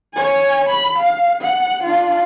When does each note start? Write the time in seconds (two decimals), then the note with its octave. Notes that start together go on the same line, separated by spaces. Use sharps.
0.15 C#5 G#5
0.69 B5
0.99 F5
1.42 F#5
1.84 D4 F4